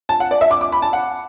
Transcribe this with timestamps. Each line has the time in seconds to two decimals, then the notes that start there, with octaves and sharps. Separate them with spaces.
0.09 A5
0.20 F#5
0.31 D5
0.41 E5
0.51 D6
0.61 D6
0.72 B5
0.82 A5
0.93 F#5